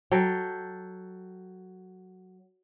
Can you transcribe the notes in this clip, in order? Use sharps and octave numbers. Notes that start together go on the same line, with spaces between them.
F#3 A4 G5